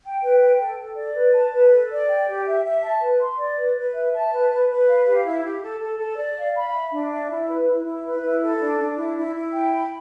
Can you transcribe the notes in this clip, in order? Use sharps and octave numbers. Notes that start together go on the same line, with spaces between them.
G5
B4
G5
A4
A4
D5
B4
A5
B4
A4
D5
G5
G4
E5
E5
A5
B4
C6
D5
B4
B4
E5
A5
B4
B4
B4
F5
G4
E4
G4
A4
A4
A4
D5
F5
B5
E5
D4
E5
E4
B4
E4
E4
B4
E4
A4
D4
D4
E4
E4
E4
G5
B5